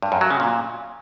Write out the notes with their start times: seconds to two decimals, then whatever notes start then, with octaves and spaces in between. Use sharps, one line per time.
0.02 G2
0.12 F#2
0.21 F#3
0.31 C#3
0.40 A#2